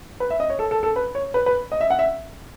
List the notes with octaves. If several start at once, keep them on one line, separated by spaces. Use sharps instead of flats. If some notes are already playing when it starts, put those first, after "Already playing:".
B4
E5
D#5
C#5
A4
A4
A4
B4
C#5
B4
B4
D#5
E5
F#5
E5